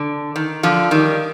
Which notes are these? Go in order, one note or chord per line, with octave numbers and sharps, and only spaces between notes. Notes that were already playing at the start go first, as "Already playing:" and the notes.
Already playing: D3
D#3
D3 F3
D#3 G3